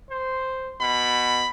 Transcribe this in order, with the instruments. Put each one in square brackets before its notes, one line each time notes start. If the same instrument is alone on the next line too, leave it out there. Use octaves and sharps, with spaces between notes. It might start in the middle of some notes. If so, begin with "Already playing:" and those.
[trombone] C5
[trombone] B2 [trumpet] B5